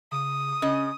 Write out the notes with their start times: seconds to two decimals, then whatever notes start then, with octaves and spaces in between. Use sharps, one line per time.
0.12 C#3 D#6
0.62 C#3 C#4 D#5